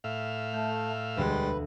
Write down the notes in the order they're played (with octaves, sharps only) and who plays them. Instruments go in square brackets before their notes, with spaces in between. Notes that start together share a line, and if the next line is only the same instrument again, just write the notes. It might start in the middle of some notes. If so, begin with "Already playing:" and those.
[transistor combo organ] A2 E5 F5
[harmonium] A3 [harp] G6
[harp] E1 D2 [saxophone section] G3 G#3 [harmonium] B4